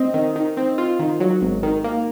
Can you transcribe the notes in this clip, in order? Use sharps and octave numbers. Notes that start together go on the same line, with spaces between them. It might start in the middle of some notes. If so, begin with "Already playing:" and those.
Already playing: C4 D#5
D#3
D#3
C4
F4
D#3
F#3
G#1
D#3
A#3